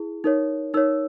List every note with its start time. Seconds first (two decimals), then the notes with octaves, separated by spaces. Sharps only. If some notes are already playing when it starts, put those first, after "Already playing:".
Already playing: E4 G#4
0.24 D#4 A#4 C#5
0.74 D#4 A#4 C#5 E6